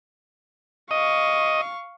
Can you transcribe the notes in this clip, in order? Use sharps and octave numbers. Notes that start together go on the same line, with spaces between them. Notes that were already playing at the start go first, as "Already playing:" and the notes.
D#5 F5 C#6